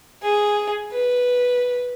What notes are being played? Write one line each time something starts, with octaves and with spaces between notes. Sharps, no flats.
G#4
B4